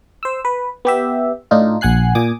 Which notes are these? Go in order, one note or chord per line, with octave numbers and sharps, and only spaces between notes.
C5 E6
B4
B3 G4 E5
A2 D4 D#4 F4
A#1 F#5 G#5 F#6 C7
A#2 G#5 D6 D#6